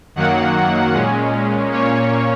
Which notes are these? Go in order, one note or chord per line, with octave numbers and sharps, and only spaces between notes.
F#2 D#3 F#3 A#3 F#5
A#2 G#3 C#4
A#2 A#3 C#4 C#5